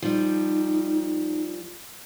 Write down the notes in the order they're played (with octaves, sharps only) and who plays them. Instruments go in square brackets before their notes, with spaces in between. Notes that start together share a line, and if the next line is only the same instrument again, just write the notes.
[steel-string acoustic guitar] F3 G3 [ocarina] D#4